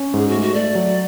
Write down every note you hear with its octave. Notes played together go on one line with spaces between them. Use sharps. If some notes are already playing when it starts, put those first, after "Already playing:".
Already playing: C#4
G#2 G#4
F#4
A3
F#4
A3 D5
F#3